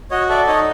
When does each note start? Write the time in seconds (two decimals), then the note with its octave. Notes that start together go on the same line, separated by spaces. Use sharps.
0.11 F#4 C#5 D#5
0.29 A4 D5 E5
0.47 D#4 C#5 D#5